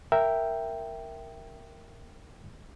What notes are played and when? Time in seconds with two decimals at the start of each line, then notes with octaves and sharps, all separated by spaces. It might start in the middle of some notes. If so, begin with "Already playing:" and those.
0.12 A#4 E5 G5